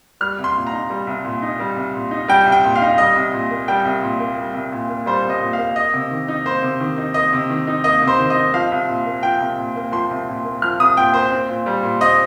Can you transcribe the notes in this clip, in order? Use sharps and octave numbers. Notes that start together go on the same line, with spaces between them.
G3 F6
C2
C6
A#2
A#5
D#4
G3
C2
A#2
D#4
G3
C2
A#2
D#4
G3 G5
C2
G5
A#2
F5
D#4
G3 D#5
C2
A#2
A#3
G3 G5
C2
A#2
A#3
G3
C2
A#2
A#3
G3 C5
C2
D#5
A#2
A#3 F5
A#3 D#5
C3
D#3
D#4
A#3 C5
C3
D#3
D#4
A#3 D#5
C3
D#3
D#4
A#3 D#5
C3
C5
D#3
D#5
D#4
F3 F5
C2
A#2
A#3
F3 G5
C2
A#2
A#3
F3 C6
C2
A#2
A#3
F3 F6
C2 D#6
A#2 G5
A#3 C5
C4
A#2
G3
A#2
C4 D#5